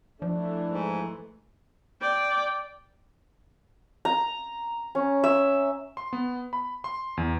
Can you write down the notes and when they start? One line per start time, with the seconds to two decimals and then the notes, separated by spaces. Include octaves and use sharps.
0.22 E3 F3 A3 D4
0.70 G#2
2.01 D5 G5
4.05 A#5
4.95 C#4
5.24 E5
5.97 C6
6.13 B3
6.53 B5
6.84 C6
7.17 E2